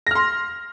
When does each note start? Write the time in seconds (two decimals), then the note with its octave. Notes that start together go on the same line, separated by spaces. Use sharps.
0.07 A#6
0.11 F6
0.15 C6